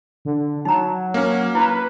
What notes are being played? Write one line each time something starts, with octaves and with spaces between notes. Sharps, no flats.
D3
F#3 D#4 A#5
A#3 C#4
E4 B4 A#5